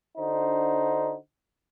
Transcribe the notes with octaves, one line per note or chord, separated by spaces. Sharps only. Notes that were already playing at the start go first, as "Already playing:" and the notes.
D3 D4 D#4 F#4 C5